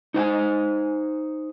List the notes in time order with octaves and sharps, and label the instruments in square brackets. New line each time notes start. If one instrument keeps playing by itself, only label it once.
[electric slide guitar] D#4 C5 G5 G#5